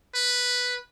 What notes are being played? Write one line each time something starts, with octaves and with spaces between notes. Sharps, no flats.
B4